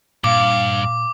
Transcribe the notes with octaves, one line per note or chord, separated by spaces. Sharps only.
G2 A#2 F5 D6